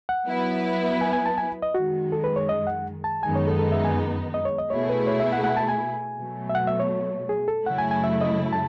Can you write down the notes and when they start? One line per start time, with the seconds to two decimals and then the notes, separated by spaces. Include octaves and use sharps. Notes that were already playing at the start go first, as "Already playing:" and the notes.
0.09 F#5
0.27 F#3 B3 E4 B4
1.01 G#5
1.13 G#5
1.26 A5
1.38 G#5
1.62 D#5
1.75 F#2 D#3 G#3 F#4
2.12 A4
2.24 B4
2.36 C#5
2.49 D#5
2.67 F#5
3.04 A5
3.23 F#2 D#3 G#3 B3 D#4 G#5
3.35 C#5
3.47 A4
3.59 A4
3.72 E5
3.85 G#5
4.34 D#5
4.45 C#5
4.58 D#5
4.70 B2 A3 E4 G#4 C#5
4.89 B4
5.07 C#5
5.20 E5
5.33 F#5
5.44 F#5
5.57 A5
5.68 G#5
6.18 B2 F#3 A3
6.49 E5
6.55 F#5
6.67 E5
6.80 C#5
7.29 G#4
7.48 A4
7.66 F#2 C#3 F#3 A3 E4 F#5
7.79 G#5
7.91 G#5
8.04 E5
8.21 D#5
8.53 A5